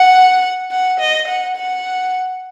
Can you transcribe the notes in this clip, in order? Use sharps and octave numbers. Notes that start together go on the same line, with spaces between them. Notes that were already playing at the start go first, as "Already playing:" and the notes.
Already playing: F#5
F#5
D#5
F#5
F#5